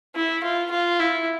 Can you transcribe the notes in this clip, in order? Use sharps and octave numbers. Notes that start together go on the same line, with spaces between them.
E4
F4
F4
E4